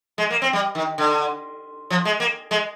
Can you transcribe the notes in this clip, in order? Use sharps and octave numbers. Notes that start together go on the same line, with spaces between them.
G#3
A#3
C4
G3
D#3
D3
F3
G#3
A#3
G#3